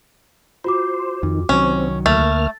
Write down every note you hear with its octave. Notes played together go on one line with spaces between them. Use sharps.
F4 F#4 C5 D6
F2 D#3
C2 D#3 F#3 C4 C#4
D2 A3 A#3 F6 A6